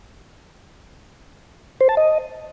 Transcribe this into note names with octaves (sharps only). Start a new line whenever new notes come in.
C5
A5
D#5